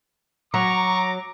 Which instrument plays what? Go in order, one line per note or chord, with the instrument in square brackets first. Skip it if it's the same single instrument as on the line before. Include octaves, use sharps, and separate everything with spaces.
[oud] F#3 [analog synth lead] A#5 [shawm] C#6 [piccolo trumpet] D6